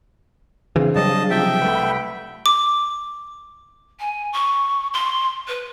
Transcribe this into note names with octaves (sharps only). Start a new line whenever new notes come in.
C#3 E3 C4 D4 G#4 F5
C#3 F#3 G3 D#5 A5
C3 F3 E5 G5
C2 A3 B4 F#5 B5
D6
G#5
C#6
C6
B4